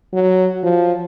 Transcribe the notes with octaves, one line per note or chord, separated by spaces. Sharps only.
F#3
F3